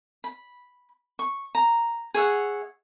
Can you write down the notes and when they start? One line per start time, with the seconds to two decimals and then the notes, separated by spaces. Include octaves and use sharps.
0.24 B5
1.19 C#6
1.55 A#5
2.14 G#4 C#5 E5 F#5